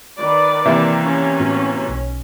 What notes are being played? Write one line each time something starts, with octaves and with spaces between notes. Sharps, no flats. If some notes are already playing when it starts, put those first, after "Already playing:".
D#3 B4 D5
C3 E3 A#3 E5
C#4
A2 B3 F#4
B1 B2